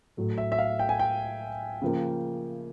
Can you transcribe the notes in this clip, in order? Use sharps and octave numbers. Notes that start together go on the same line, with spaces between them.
A2 F#3 A3
E5
E5
F5
G5
G#5
G5
C#3 F3 A#3